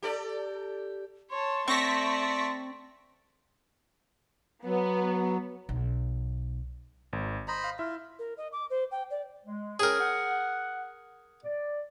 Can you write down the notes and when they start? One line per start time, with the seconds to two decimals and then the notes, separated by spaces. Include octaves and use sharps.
0.03 G4 A4 D5
1.30 C#5 A5 C6
1.68 A3 C4 D5 C#6 A#6 B6
4.65 F#3 B3
5.69 B1
7.13 G#1
7.48 C5 D#5 A#5 B5
7.64 F5
7.79 E4 F4 E5
8.19 A#4
8.38 D#5
8.52 D6
8.70 C5
8.91 G5
9.10 D5
9.46 G#3
9.80 C#4 G#4 A#4 C#5 G5
10.00 F#5
11.44 D5